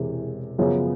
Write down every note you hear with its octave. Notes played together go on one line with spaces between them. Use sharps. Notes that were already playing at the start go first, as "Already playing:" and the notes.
Already playing: E1 E2 C3 E3 G#3
F#2 C#3 F3 G#3 B3